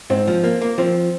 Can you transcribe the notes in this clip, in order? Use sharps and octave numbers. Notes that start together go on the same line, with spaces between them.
G#2 C4
F3
A#3
A#3
F3 C4